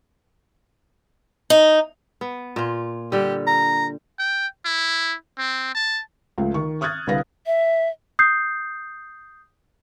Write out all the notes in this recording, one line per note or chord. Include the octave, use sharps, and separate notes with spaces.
D#4
B3
A#2 F4
D3 G3 G4
A#5
G5
E4
C4
A5
C#2 F3 A3
D#3 C#6
C#6 D#6 F6 F#6 G#6 A6
C2 D3 E4 B4 F5 A#6
E5
D#6 G6 C7